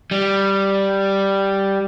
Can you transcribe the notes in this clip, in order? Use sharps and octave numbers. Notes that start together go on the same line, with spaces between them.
G3